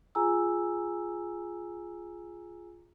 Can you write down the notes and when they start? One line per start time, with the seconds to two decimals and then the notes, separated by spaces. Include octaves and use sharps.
0.15 F4 G#4 G#5 A#5 E6